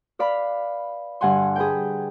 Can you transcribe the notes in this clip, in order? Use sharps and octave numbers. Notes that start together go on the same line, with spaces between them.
B4 D5 F5 B5
G2 D3 F#5 G#5 C6
G#4 B4 G5